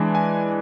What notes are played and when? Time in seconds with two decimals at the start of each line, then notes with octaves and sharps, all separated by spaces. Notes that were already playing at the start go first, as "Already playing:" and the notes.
Already playing: E3 G#3 D4
0.15 G#5